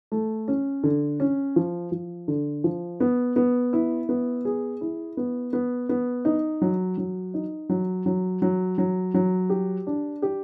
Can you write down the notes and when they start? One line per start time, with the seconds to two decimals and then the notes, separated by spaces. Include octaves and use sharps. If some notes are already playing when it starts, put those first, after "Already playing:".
0.12 A3
0.48 C#4
0.84 D3
1.20 C#4
1.56 F3
1.92 F3
2.28 D3
2.64 F3
3.00 B3
3.36 B3
3.73 E4
4.09 B3
4.45 G#4
4.81 E4
5.17 B3
5.53 B3
5.89 B3
6.25 D#4
6.62 F#3
6.98 F#3
7.34 D#4
7.69 F#3
8.06 F#3
8.42 F#3
8.78 F#3
9.14 F#3
9.50 G4
9.87 D4
10.22 G4